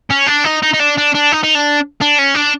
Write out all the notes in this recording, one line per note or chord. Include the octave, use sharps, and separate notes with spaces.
C#4
D4
D#4
D#4
D#4
D4
D4
D4
D#4
D#4
D4
D4
C#4
D4